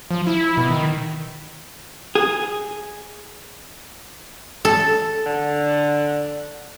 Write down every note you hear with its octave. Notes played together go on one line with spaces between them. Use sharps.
F3
E4
B2
D#3
G#4
A4
D3